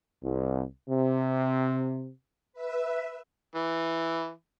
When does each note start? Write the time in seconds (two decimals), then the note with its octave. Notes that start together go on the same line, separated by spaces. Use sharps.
0.23 C2
0.88 C3
2.53 B4 E5
3.55 E3